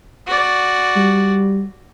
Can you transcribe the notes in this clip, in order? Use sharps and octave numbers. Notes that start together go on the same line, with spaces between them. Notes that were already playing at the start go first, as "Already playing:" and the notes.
F#4 D5
G3